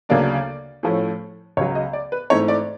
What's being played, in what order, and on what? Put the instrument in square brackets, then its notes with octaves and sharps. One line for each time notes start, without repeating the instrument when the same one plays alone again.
[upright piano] D2 C#3 F#3 A#3 D4 D5
A2 F3 A3 C#4
C#2 C#3 F#3 C#5
D#5
D5
B4
G#2 E3 A3 C4 C#5
D5